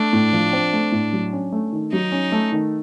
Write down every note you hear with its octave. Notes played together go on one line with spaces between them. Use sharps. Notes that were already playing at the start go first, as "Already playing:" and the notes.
Already playing: A3 D4
A2
F3
C4
A3
A2
F#3
C#4
A3
D#3
F#3 D#4
C#4
A3
D#3